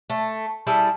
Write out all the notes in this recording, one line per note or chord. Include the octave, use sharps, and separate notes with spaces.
A3
G3 E4 G#4 A4